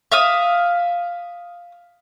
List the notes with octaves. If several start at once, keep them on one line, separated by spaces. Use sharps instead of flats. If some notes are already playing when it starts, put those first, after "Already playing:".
E5 F5 D#6